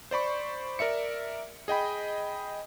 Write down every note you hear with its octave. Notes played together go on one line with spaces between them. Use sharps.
C5 D5 B5 C#6
A#4 D5 E5 C#7
G#4 D#5 G5 B5